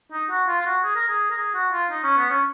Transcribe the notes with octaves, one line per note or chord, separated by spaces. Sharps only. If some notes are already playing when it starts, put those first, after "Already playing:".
D#4
F#4
F4
F4
F#4
G#4
A#4
G#4
A#4
G#4
F#4
F4
D#4
C#4
B3
C#4